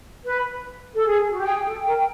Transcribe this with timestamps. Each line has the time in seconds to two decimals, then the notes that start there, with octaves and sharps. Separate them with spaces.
0.25 B4
0.94 A4
1.06 G#4
1.30 F#4
1.38 G4
1.46 G#4 G5
1.67 A4
1.86 A#4